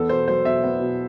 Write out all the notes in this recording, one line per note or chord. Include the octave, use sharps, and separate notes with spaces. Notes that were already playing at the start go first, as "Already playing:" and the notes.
Already playing: E2 B3 A4
B2 C5
F#3 C5
B2 E5
B3
B2